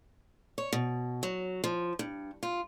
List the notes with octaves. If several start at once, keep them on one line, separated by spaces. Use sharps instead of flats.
C#5
B2
F#3
F3
G2
F4